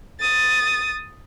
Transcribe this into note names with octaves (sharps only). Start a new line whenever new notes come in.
D#6 A6